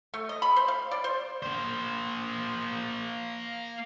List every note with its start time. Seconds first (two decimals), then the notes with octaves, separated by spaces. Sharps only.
0.14 A3
0.29 D#5
0.42 B5
0.56 C5
0.68 F5
0.91 D5
1.04 C5
1.42 A#3 C5